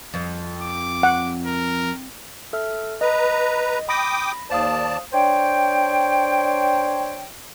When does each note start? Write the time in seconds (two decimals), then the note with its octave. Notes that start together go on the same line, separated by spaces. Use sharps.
0.14 F2
0.62 D6
1.03 F#5
1.46 A#4
2.53 A4 E5 F6
3.01 B4 D#5 A#5
3.89 G5 B5 D6 D#6 A#6
4.50 D#2 C5 D5 F5 A5 D#6
5.13 D4 C5 C#5 G5